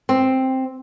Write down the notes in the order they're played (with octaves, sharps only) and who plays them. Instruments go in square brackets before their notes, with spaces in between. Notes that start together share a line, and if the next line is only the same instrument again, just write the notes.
[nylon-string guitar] C4